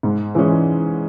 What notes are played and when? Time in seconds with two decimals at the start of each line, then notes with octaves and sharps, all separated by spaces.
0.03 G#2
0.35 E3 G#3 C#4 G#4